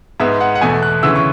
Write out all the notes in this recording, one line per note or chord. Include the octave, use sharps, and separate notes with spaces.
G#2 G#3 B3 E5
F#5
F#5
E2 B2 A3 G#5
F#6
D2 C#3 E3 E6
C#6